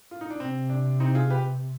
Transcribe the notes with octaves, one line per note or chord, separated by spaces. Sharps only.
F4
D#4
D4
C3 C4
D4
C4 D#4
F4 G#4
G4 B4